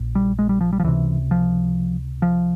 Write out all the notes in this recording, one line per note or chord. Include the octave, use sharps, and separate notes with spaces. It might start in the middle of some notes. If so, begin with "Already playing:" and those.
Already playing: A#1 A#2
G3
G#3
G3
F3
G3
F3
C#2 C3 E3
F3
F3